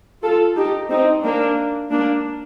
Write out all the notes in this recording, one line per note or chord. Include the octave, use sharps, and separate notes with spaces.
F4 A4
D#4 G4
C4 D#4
A#3 D4
A#3 D4